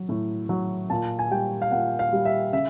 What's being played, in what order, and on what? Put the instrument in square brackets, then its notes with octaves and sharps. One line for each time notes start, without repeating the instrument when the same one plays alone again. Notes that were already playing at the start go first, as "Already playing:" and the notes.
Already playing: [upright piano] F#3
A2
F#3
A#2 A5
G#5
G3 G5
F5
A#2 F#5
F5
G3
E5
C#3 E5